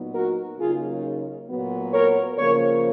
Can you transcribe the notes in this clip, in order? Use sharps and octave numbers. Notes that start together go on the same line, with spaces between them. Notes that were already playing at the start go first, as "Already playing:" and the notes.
Already playing: A#2 F#3 B3 D#4
F#4 A#4
C#3 F#3 A#3 D#4 F4 G#4
A#2 F#3 B3
A#4 C#5
C#3 F3 A#3 A#4 C#5